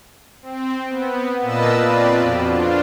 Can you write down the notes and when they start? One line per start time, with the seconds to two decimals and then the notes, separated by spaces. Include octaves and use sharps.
0.42 C4
0.88 B3
1.42 A#2 A#3 B4 D#5 A5 E6
1.80 C4 F4 B4 D5
2.17 F2 B2
2.45 D4 F4